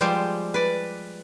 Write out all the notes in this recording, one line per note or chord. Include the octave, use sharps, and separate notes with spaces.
F3 G3 G#3 G4 C5
B4 D5